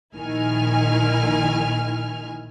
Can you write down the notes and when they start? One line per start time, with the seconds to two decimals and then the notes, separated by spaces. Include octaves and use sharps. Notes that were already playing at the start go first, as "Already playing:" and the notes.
0.15 A#1 D#3 E4 G#5 F6